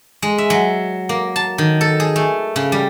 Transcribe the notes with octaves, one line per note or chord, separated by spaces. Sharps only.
G#3
E5
F#3
A#3
A5
D#3
A4
G#4
A3
C#3
G3